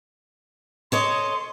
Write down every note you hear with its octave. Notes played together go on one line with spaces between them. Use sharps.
A4 C#5 D#5 C6